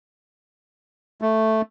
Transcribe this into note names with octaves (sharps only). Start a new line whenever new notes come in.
A3